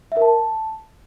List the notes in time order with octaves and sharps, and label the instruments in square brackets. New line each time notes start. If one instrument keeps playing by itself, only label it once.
[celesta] E5
A#4
A5